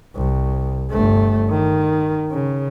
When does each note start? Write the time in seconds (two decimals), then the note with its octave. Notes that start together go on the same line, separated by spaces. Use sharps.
0.16 C2
0.91 G1 A3
1.49 D#3
2.31 C#3